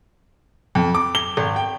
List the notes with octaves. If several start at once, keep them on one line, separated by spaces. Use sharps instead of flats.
F2
D6
G7
G#1
G5